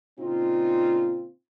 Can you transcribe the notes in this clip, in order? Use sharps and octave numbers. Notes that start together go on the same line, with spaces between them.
A#2 C#3 C4 D#4 F4